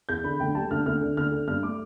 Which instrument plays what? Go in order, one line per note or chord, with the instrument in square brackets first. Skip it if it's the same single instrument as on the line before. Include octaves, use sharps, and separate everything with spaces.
[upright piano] E2 G6
D3 B5
D2 G5
G3 A5
D2 F6
D2 F6
D3
D2 F6
D3
G2 F6
A3 D6